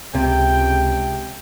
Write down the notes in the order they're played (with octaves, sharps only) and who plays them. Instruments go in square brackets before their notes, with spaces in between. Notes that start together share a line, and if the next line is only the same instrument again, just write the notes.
[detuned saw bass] C#2 [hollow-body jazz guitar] C3 [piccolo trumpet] G5